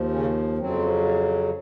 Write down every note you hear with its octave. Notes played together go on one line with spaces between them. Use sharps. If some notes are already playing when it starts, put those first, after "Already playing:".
Already playing: D#2 F3
C#3 C#4
F2 C#3 F#3 C4